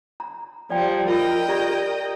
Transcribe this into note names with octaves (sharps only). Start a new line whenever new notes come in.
A#5
F3 G3 D5 G5
F4 A#4 D#5 G5 E6
G4 D5 A#5